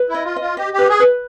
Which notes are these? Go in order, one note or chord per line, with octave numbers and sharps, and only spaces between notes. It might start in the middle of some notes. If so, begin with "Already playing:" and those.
Already playing: B4
E4
D#5
F4
F4 D#5
G4 D#5
G4 B4
G#4
B4